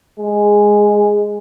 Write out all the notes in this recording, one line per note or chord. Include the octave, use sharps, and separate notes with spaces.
G#3